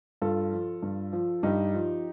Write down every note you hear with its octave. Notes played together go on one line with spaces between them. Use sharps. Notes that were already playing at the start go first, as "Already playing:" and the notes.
G2 F4 A4
F3
G2
F3
G2 D#4 G4
F3